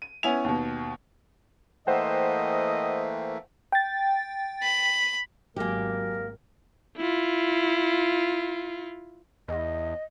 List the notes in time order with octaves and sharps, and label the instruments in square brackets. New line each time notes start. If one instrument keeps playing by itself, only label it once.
[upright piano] D#7
B3 C#4 E4 G#5 F7
D#2 B2
[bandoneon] E3 A3 A#3 [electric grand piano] C5 F#5 G5 [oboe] D#5
[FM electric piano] G5 A6
[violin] B5
[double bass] G#1 [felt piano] F#3 G#5 [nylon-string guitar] A#3 G4 [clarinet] A#4
[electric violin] E4 F4
[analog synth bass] E2 [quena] D#5